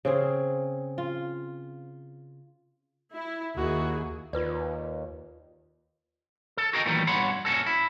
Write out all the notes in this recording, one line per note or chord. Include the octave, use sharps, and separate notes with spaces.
C#3 C4 G#4
F4
E4
D#2 E4 F#4 G#4
D#2 F4 B4 D5
A4
F#4 G#4 A#4 D#5 F5 G5
A#2 D#3 E3 F#3 G3 A3
G2 B2 C#5 F#5 B5 C6
A#2 C#4 F#4 A4
E4